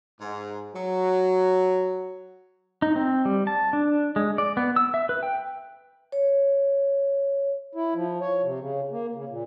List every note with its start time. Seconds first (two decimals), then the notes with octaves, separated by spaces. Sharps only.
0.20 G#2
0.74 F#3
2.82 D#4
2.96 C4
3.25 G3
3.47 A5
3.73 D4
4.16 G#3
4.38 D5
4.57 B3
4.76 E6
4.94 E5
5.09 B4
5.23 G5
6.12 C#5
7.75 E4
7.95 F3
8.21 C#5
8.43 C3
8.60 C#3
8.91 A#3
9.15 C#3
9.29 A#2